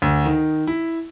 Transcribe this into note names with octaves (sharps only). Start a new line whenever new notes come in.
D2
D#3
E4